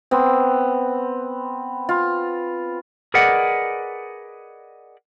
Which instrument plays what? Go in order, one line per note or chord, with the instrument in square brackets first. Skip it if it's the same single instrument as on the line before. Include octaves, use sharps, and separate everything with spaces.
[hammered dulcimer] B3 C4
F4
[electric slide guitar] G#4 A#4 B4 D5 D#5 F#5